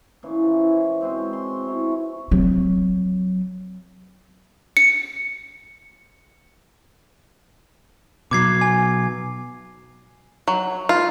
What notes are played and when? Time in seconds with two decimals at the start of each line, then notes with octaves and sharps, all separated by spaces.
0.23 A#2 E3 C#4
0.43 E3 F3
0.69 C#4
1.01 G#3 C4 F#4 C6
1.33 C6
1.65 B2 E4 C#5
2.31 F#3 C4
4.77 C#7
8.31 B2 F#3 D6 G#6 C7
8.61 G#5
10.48 F#3
10.89 F4